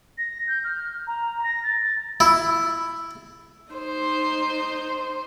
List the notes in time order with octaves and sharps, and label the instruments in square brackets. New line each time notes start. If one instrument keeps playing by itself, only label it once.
[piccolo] A#6
G6
F6
A#5
A#6
A6
A6
[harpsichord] E4
[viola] D#4 C5